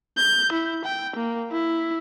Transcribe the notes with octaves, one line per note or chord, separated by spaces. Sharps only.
G6
E4
G5
A#3
E4